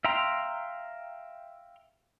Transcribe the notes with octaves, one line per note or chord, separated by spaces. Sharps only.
E5 F5 G5 A#5 C6